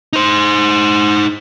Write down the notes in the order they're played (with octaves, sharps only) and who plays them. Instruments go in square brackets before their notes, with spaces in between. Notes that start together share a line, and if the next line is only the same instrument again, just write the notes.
[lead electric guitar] D#4 C5